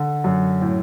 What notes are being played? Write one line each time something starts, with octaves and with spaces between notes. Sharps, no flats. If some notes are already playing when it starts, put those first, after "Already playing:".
Already playing: D3
F#2
A2